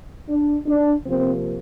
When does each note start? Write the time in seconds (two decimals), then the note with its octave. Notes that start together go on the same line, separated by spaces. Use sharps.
0.29 D4
0.67 D4
1.04 C3 F3 A#3 C4